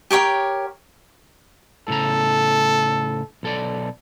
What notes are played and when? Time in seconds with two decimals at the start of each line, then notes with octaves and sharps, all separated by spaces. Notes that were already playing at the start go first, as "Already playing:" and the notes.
0.11 G4 A#4 C#5 G5
1.88 A2 C#3 A4 A#5
3.43 B1 A4 D5